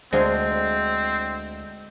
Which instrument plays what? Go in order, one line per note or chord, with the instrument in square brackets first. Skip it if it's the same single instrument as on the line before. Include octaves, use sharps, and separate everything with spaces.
[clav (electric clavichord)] D2 D4 F5 [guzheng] G#3 [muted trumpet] C4 [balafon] C5